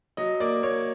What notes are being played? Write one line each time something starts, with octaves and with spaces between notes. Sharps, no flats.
F#3 D#5
A#3 D5
A#3 C#5